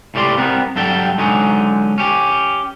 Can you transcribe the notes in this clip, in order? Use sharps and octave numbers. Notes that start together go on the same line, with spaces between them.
A2 G3 G4 D5 C6
G3 B3 C4 A#4
G2 F#3 G3 A4 G5
D3 F#3 G#3 C#4 D#4
C#4 G4